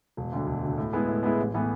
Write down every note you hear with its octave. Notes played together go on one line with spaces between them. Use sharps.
E1
D2 D3
E1
D2 D3
A2
G#3 B3 E4 G#4
A2
G#3 B3 E4 G#4
A1
A2 E3 B3